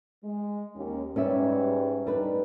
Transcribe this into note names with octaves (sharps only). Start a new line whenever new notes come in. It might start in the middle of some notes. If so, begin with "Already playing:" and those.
G#3
D#2 C#4
G#2 G3 C#4 B4 D5 E5
G3 A3 D4 D#4 B4